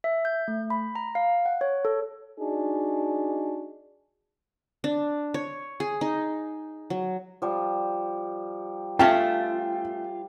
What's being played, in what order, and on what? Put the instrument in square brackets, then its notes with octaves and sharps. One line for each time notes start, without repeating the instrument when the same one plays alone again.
[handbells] E5
G6
A3
B5
A#5
F5
F#5
C#5
A4
[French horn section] D4 D#4 F#4 G#4
[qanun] D4
C#5
G#4
D#4
F#3
[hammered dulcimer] F3 G3
[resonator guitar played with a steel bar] A3 C#4 A5 [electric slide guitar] F4 [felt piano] G5